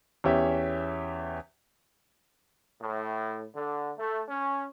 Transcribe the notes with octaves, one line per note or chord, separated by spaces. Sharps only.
E2 C#4 G4 E5
A2
D3
A3
C#4